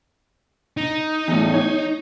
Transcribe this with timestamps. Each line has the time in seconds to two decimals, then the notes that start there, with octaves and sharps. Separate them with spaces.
0.77 D#4
1.28 E2 A2
1.54 C#5